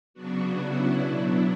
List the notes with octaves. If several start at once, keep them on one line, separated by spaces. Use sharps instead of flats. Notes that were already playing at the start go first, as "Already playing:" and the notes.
C#3 F#3 B3 D4 F#4
E4
B2 F#3 B3 D4 E4